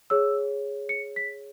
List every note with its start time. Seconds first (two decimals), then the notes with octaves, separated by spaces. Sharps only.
0.10 G#4 C#5 E6
0.89 C#7
1.16 B6